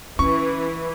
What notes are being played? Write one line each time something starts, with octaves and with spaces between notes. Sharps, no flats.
E3 C#4 C#6